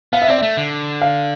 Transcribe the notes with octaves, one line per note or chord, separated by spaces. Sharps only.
B3 F5
E5
C4 D5
A3 E5
D3
F5